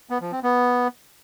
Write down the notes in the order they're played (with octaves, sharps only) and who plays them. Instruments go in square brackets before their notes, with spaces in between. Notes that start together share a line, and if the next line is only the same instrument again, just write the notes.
[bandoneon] B3
F3
C4
B3